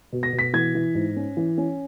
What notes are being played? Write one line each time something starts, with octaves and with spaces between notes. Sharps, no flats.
B2
A#6
B2
B6
E3 G#6
E3
G#2
C#4
E3
C#4